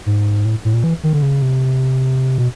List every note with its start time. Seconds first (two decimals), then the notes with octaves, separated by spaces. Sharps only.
0.06 G#2
0.45 A2
0.65 A2
0.74 A#2
0.84 E3
1.03 D#3
1.13 D3
1.22 C#3
1.42 C3
2.38 B2